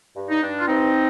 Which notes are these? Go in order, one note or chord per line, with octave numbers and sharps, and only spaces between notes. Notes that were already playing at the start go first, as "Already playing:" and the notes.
G2
D#4
G2 D4
F4
G2 C4 D#4